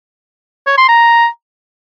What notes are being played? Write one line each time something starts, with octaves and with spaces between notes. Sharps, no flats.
C#5
C6
A#5